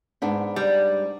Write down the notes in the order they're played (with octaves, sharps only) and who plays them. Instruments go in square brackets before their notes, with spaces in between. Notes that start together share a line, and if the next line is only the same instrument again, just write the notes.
[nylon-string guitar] G#2 B3 D4
[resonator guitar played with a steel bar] G3